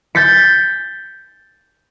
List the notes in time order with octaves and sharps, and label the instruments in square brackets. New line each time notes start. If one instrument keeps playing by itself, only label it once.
[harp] G6 A6 B6 C#7